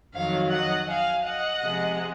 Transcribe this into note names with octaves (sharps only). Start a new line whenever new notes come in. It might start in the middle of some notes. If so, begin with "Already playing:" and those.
F2 D#3 F#3 C#5 F5
D#5 F#5
F5 G#5
D#5 F#5
C3 F3 G#3